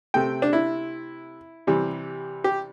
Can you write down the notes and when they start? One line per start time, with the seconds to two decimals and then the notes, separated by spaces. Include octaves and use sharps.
0.14 C3 A3 G5
0.42 D4
0.53 E4
1.67 C3 E3 G3
2.44 G4